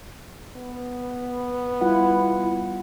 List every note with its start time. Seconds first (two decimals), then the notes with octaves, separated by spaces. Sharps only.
0.56 B3
1.81 G3 E4 F4 F#5